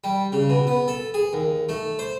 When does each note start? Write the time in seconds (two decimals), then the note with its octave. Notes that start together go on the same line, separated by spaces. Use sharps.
0.04 G3
0.32 C#3
0.50 B2
0.67 B3
0.88 A4
1.14 G#4
1.33 D#2
1.69 A3
1.99 C5